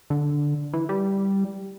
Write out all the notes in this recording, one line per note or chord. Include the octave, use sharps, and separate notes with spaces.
D3
E3
G3